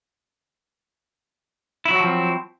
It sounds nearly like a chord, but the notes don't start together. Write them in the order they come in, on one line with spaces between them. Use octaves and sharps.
E4 F#3 F#4 F3 C4